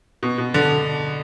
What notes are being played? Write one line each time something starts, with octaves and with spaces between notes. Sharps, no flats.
B2
B2
D3